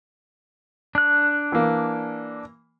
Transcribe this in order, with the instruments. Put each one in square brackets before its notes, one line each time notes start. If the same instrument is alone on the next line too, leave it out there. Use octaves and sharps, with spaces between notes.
[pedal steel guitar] D4 F#6
[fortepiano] E3 A#3